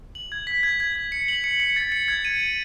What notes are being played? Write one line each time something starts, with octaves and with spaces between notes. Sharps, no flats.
F#7
G#6
B6
G#6
G#6
G#6
C#7
F#7
C#7
C#7
A6
C#7
G#6
D#7
D#7